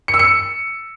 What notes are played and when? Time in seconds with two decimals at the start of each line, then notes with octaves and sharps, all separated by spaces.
0.08 C#7
0.14 E6
0.19 C#7